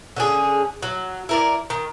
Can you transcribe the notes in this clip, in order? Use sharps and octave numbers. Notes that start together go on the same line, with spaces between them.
D3 C#4 G#4
F#3
E4 A#4 D5
D#3